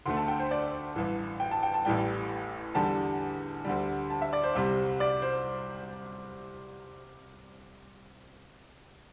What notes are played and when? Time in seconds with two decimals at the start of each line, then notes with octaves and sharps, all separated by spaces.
0.06 D2 D3 A3 C6
0.17 A5
0.28 G5
0.39 C5
0.51 D5
0.96 A1 G2 E3
1.40 G5
1.51 A5
1.63 G5
1.74 A5
1.85 A1 A2 E3 G3 G5
2.75 E2 D3 G3 A5
3.65 D2 D3 G3
4.10 A5
4.22 E5
4.33 D5
4.44 C5
4.55 C2 C3 G3
5.00 D5
5.22 C5